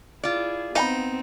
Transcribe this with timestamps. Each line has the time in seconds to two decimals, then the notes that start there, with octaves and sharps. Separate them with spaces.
0.24 E4 F4 G#4 D5
0.76 B3 C4 D#4 F5 G#5 B5